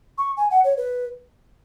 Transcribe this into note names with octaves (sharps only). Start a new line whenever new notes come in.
C#6
G#5
F#5
C#5
B4